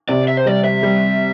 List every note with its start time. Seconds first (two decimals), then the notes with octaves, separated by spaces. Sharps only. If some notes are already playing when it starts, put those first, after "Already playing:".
0.09 C3 D5
0.28 E5
0.37 C5
0.46 G3 D5
0.64 E5
0.83 G3